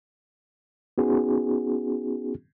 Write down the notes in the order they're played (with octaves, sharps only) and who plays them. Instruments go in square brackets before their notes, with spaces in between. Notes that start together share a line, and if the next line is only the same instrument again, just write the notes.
[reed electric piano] B3 C#4 D#4 F#4 G#4